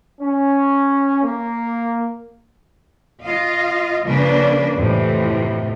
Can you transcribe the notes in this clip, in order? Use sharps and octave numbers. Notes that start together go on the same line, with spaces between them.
C#4
A#3
F4 D#5 F5
C#3 F3 A#3 D4 B4
F2 A2 C3 E3